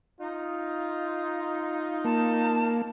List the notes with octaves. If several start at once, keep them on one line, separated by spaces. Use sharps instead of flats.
D#4 F4
A#3 A5